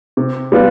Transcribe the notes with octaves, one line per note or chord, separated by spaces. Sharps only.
C3
G3 B3 F4 B4